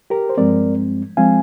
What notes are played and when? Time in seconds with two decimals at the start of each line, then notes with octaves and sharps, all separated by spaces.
0.10 G4 A#4
0.29 C5
0.37 G2 F3 G#3 C4 A#4 D5
1.17 F3 G#3 C4 F5 G#5